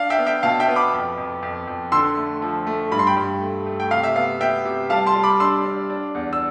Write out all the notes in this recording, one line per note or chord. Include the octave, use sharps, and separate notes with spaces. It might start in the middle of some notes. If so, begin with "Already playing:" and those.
Already playing: D4 F5
E5 G5
B3
E5 G5
B2 F5 A5
E5 G5
B3
B5 D6
F2
F2
F2
F2
D3 C6 E6
A3
F3
A3
G2 B5
C6
G5 B5
G2
A3
A3
G5
C3 F5
E5
B3 F5
B3 E5 G5
C3
G3 F5 A5
A5 C6
G3
B5 D6
D4 C6 E6
D4
D4
E2
E6